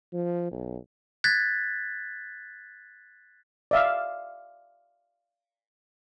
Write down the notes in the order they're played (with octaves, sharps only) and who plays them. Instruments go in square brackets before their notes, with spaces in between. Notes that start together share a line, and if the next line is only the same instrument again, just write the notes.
[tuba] F3
B1
[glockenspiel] F#6 G#6 A6 B6
[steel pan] D5 E5 F5